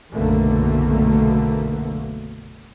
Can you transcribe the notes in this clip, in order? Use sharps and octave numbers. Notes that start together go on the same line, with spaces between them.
F#1 B1 B2 D3 A3 A#3